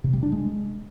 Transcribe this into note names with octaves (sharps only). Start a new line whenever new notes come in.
C3
G3
D4
G#3